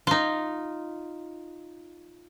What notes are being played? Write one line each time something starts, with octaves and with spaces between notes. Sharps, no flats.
D#4 F4